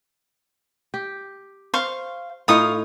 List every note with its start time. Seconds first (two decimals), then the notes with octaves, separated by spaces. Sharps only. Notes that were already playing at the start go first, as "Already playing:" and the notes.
0.94 G4
1.74 C5 F5 C#6
2.48 A2 D#4 F4 C#5 F5 D#6